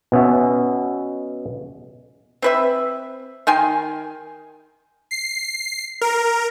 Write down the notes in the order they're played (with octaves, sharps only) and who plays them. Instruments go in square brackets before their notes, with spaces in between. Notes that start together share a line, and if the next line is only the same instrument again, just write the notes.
[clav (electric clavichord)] B2 B3 C#4 E5
[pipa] C4 B4 E5
D#3 G5 G#5 C6
[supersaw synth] C7
A#4